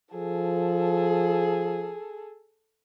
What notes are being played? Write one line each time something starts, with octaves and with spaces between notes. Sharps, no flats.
F3 G#4 A4